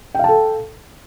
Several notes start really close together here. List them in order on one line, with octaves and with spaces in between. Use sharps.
G5 F5 A5 A4